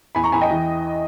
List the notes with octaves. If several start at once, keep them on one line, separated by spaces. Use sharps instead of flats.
E2 G#5 B5
A#5 C#6
E2 G#5 B5
D#5 G5
E3